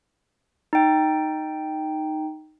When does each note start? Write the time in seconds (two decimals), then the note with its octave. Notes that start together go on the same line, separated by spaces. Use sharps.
0.73 D#4 G5